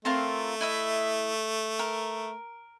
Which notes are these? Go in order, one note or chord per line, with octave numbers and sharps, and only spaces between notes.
A3 C4 F4 A#4
E4 D#5 E5
A#4